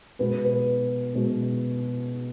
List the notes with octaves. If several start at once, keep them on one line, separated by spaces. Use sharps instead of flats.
B2 G#3 B3 B4
B4
B2 G#3 B3